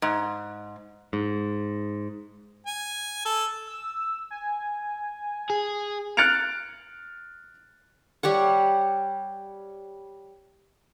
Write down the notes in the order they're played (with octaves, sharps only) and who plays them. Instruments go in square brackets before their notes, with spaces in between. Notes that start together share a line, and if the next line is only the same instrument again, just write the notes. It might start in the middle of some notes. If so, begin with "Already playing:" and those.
[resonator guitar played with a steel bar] G#2
[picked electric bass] G#2
[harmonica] G#5
A4
[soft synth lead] E6
G#5
[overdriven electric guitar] G#4
[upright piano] F6 F#6 A6 C#7 D7 F7
[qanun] G3 G4 C#5 F#5